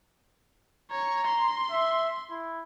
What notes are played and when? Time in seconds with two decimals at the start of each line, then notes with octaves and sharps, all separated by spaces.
0.92 C#5 A#5
1.27 C6
1.72 E5
2.30 E4